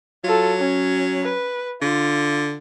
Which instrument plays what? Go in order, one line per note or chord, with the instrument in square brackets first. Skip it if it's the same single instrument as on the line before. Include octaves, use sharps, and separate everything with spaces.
[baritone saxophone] F#3 [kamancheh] F4 A4
[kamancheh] C#4
B4
[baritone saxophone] D3 [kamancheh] F4